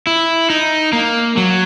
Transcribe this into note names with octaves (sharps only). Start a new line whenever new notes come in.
E4
D#4
A#3
F#3